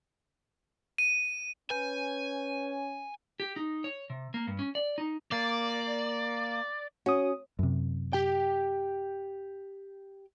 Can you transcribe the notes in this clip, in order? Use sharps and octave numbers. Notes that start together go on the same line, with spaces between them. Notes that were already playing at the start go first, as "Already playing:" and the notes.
D#7
C#4 B4 G#5 G6
G4
D#4
C#5
C3
A#3
G2
C#4
D5
D#4
A#3 D5
C#4 F#4 D#6
F#2 C3
G4 G5